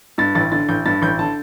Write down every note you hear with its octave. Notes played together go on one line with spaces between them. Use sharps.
G2 A6
A1 A6
D3 A6
A1 G6
G2 A6
A1 G6
D3 A5